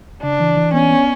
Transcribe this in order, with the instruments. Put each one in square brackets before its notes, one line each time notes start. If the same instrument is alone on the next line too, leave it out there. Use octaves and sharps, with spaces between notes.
[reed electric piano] C#3 [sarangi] D4
[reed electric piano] E3
E3
[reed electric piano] B3 [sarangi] C#4
[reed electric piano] B3